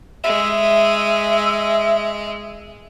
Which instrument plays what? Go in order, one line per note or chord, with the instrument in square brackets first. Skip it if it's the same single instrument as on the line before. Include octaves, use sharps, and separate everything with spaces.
[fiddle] G#3 [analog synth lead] E5